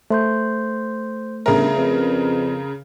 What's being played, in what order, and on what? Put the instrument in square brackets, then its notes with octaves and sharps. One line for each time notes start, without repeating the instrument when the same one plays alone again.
[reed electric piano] A3 [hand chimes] C5 C6 G6
[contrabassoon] G1 [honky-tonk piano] C#3 A#4 [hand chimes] E5
[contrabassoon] F2 [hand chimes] B4